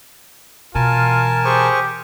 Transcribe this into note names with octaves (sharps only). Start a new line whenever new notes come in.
B2 E3 F4 A#4 G#5 A5
G4 G#4 C5 C#6